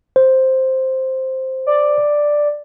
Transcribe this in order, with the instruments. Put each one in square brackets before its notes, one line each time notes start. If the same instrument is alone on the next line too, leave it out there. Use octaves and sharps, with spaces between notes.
[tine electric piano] C5
[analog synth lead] D5